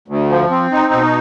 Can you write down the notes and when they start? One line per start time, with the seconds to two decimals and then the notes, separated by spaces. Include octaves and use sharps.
0.08 D2
0.29 F3
0.50 C4
0.72 D#4
0.93 B2